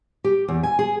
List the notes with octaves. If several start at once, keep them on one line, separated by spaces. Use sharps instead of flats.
G4
E2
G#5
G#4